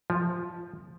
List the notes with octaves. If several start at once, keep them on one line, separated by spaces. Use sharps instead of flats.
F3